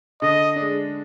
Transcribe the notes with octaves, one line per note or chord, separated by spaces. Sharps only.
D3 D#5
D4
G#3